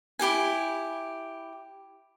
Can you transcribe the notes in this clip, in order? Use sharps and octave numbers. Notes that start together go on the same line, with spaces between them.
E4 G4 G#4 G#5